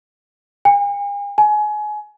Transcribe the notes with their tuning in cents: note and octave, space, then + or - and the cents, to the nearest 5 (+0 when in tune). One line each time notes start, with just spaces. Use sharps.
G#5 -45
G#5 +25